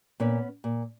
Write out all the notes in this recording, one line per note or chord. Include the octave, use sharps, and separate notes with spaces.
A#2 B3 C#4
A#2